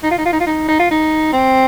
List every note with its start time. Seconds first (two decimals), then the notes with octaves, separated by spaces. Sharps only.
0.03 D#4
0.11 F4
0.18 D#4
0.25 F4
0.32 D#4
0.40 F4
0.47 D#4
0.68 D#4
0.79 F4
0.91 D#4
1.32 C4